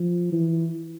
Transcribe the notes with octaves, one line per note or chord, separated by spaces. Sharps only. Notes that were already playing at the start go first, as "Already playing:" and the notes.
Already playing: F3
E3